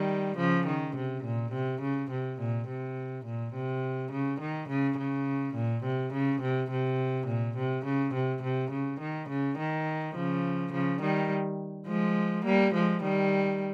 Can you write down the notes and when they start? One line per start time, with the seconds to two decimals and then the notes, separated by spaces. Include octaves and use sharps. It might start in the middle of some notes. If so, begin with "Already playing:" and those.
Already playing: D#3 G3
0.37 C#3 F3
0.67 D#3
0.96 C3
1.24 A#2
1.52 C3
1.82 C#3
2.11 C3
2.39 A#2
2.68 C3
3.25 A#2
3.54 C3
4.12 C#3
4.41 D#3
4.69 C#3
4.98 C#3
5.55 A#2
5.83 C3
6.13 C#3
6.42 C3
6.71 C3
7.27 A#2
7.57 C3
7.85 C#3
8.14 C3
8.43 C3
8.71 C#3
9.00 D#3
9.29 C#3
9.58 D#3
10.15 C#3 F3
10.72 C#3 F3
11.02 D#3 G3
11.87 F3 G#3
12.45 G3 A#3
12.74 F3 G#3
13.03 D#3 G3